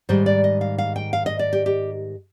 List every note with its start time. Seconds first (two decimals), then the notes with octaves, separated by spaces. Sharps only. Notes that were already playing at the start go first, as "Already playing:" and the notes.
0.09 G#2 D#3 G3 C5
0.26 D5
0.44 D#5
0.61 F5
0.78 F5
0.96 G5
1.13 F5
1.26 D#5
1.39 D5
1.53 G4
1.66 G4